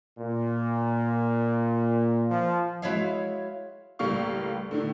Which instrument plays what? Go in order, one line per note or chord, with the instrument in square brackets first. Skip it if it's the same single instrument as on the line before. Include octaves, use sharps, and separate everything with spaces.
[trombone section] A#2
F3
[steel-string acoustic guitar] G#3 E4 F#4 C#5 E5 F5
[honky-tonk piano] C#2 A2 G3 A#3 F5 C#6
A2 D3 D#3